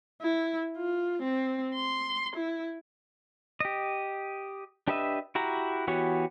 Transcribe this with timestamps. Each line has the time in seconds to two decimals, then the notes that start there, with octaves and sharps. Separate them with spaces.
0.22 E4
0.77 F4
1.23 C4
1.75 C6
2.36 E4
3.60 G4 D#5
4.88 D4 G4 B4 D#5 E5
5.35 E4 F#4 G4 A#5
5.87 E3 B3 F#4 G4 C#5